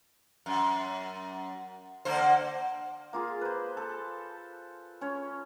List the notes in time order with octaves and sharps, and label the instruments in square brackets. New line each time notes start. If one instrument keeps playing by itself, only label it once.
[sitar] F#2
D3 A#3 C5
[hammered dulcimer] A#3 F4 G#4
B4 C5
A4
C#4 C#5